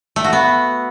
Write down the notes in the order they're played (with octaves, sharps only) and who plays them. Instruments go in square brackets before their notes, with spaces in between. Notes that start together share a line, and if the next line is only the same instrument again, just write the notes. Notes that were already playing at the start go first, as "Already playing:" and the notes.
[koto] A3
F#4
B3